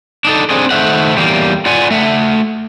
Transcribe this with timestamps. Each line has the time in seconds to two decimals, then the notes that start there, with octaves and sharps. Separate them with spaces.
0.25 D4 D#4 A4
0.50 C4 D4 G#4
0.71 D#3 A3 C5 E5 F#5
1.15 E2 G3 A#3
1.66 F4 D5 F#5 G#5
1.91 A3 E5 F#5